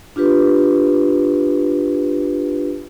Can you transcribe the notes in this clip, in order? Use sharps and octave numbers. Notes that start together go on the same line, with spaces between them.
D4 F4 G4 B4